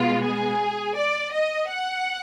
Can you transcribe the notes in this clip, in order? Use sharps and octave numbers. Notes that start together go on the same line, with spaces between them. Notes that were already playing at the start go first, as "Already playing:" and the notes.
Already playing: B2 G#3 B3 F4
G#4
D5
D#5
F#5